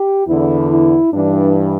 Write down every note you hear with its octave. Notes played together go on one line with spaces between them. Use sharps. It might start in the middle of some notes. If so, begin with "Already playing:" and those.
Already playing: G4
E2 D3 E4
E4
G2 E3 D4